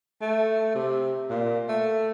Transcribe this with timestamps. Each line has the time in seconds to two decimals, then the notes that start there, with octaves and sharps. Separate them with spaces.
0.22 A3
0.75 C3
1.30 A#2
1.69 A3